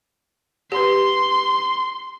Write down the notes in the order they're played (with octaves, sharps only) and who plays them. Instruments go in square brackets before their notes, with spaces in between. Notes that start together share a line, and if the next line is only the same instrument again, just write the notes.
[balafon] G4 B4 [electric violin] C6